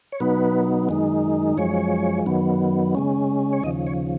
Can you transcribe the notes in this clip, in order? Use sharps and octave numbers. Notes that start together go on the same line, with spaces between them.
C#5
B2 F#3 B3 D#4 B4
F#2 D#3 G#3 D#4
F#2 F3 G#3 C#5
F#2 D#3 F#3 B3
C#3 G#3 C#4
C#5
D#2 C#3 F3 D#5
C#5